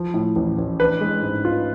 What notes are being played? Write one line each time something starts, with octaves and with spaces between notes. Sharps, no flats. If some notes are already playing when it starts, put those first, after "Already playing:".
Already playing: F3
A2
A1
A1
D4 B4
G#3
G#2
F4